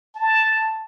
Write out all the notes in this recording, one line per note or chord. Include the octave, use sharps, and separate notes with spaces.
A5